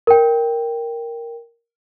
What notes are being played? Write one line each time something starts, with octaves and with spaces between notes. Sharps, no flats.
A#4 G5